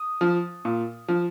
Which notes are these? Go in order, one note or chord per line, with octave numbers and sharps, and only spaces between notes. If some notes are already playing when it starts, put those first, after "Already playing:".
Already playing: D#6
F3
A#2
F3